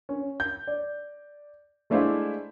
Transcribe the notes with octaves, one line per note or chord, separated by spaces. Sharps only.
C#4
G6
D5
G#3 A3 D4 E4 C5 F5